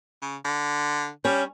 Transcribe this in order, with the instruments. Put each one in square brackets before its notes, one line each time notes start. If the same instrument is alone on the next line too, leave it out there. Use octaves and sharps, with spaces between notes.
[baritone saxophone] C#3
D3
[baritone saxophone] G3 [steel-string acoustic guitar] C#4